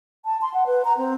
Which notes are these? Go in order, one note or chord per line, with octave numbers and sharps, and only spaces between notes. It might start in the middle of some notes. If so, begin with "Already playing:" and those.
A5
C6
F#5
B4
A#5
C4